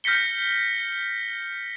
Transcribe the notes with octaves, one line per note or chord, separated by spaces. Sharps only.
F6 G6 A#6 B6 C#7 G7